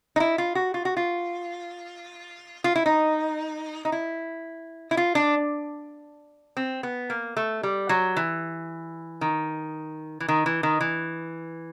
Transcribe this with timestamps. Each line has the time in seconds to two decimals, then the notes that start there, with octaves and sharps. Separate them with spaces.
0.16 D#4
0.20 E4
0.38 F4
0.55 F#4
0.74 F4
0.85 F#4
0.97 F4
2.64 F4
2.76 E4
2.86 D#4
3.85 D#4
3.92 E4
4.91 E4
4.97 F4
5.15 D4
6.57 C4
6.83 B3
7.10 A#3
7.37 A3
7.63 G3
7.89 F#3
8.16 E3
9.21 D#3
10.20 E3
10.28 D#3
10.46 E3
10.63 D#3
10.80 E3